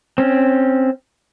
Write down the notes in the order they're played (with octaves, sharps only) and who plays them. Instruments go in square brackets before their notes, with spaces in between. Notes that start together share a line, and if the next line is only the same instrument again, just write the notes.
[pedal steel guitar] C4 C#4